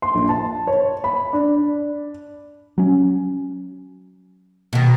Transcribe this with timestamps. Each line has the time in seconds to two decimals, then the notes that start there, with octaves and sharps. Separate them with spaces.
0.02 C6
0.15 A#1
0.29 A5
0.67 C#5
1.04 B5
1.33 D4
2.78 F#3 C#4
4.73 B2 D#3